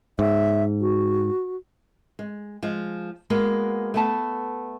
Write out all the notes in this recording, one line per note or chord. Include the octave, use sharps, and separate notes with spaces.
G#2 E5
F#4
G#3
F3 G#3
G#3 A#3 B3 F#4
A3 B3 A5